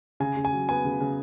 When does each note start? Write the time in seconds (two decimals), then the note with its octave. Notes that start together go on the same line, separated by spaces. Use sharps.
0.20 C#3 G#5
0.37 C#3
0.45 G#5
0.53 F#3
0.69 B3 G#5
0.85 C#3
1.01 C#3